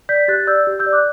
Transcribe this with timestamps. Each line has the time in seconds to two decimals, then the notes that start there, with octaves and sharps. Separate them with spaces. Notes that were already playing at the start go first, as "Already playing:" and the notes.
0.09 D5 G6 B6
0.28 G4 F#6 A6
0.47 D5 E6 G6
0.67 G4
0.79 E6 G6
0.86 D5
0.92 D6 F#6